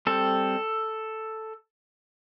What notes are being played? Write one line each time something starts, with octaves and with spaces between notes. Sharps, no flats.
G3 C4 A4